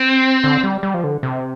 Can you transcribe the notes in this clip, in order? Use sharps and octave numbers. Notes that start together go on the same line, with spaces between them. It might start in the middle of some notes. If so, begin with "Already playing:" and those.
Already playing: C4
D3
G3
G3
F3
D3
C3